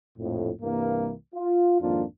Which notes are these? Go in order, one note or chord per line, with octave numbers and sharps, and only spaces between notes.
A#1 F2 A2
C2 G2 E3 A#3
F4
G#1 F2 A#3 D4 F4